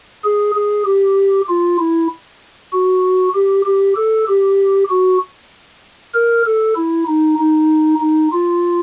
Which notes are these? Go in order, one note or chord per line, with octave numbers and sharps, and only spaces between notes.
G#4
G#4
G4
F4
E4
F#4
G4
G4
A4
G4
F#4
A#4
A4
E4
D#4
D#4
D#4
F4